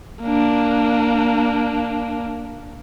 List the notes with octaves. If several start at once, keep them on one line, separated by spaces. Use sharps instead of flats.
A#3 D4